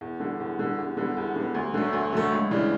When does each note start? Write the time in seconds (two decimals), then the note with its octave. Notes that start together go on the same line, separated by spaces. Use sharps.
0.01 E2
0.20 D3 G3
0.40 E2
0.59 D3 G3
0.78 E2
0.97 D3 G3 B3
1.17 E2
1.36 D3 G3 B3
1.54 D2
1.74 D3 F#3 A3
1.93 D2
2.13 D3 F#3 A3
2.31 C#2
2.51 C#3 E3 G3 D4